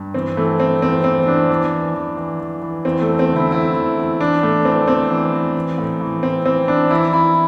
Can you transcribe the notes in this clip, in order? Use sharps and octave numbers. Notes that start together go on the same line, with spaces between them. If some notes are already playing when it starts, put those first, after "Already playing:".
Already playing: G2
E3 C4
E3 A3
E3 C4
E2 C4
E3 C4
E2 D4
E3
E3
E3
E3
E3
E3
E2 C4
A3
E2
C4
D3
E4
E2 E4
E2
E2
E3 D4
A2 A3
E3 C4
E3 C4
E3
E3
E3
A2
E3
A2 C4
E3 C4
E3 D4
E3 E4
E3 E4